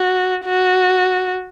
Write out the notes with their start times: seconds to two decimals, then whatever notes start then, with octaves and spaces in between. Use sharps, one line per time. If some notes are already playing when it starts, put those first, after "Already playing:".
Already playing: F#4
0.46 F#4